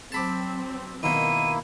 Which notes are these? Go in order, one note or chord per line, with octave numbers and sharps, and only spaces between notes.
F#3 C4 A5 B5 D6
B2 D#3 A#3 E4 D#7